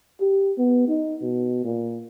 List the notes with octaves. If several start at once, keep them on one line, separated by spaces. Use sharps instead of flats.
G4
B3
D#4
B2
A#2